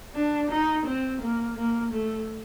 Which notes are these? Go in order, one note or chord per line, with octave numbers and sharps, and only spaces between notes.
D4
D#4
C4
A#3
A#3
A3